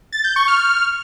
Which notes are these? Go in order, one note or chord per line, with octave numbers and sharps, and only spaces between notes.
A6
G6
C#6
F6